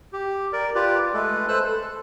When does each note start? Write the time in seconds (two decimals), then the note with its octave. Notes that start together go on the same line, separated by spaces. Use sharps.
0.13 G4
0.53 A#4 D5
0.75 F4 G4 B4 D5
1.14 G#3 A3 A4 B4
1.48 A4 B4 C5 E6 F#6
1.61 A4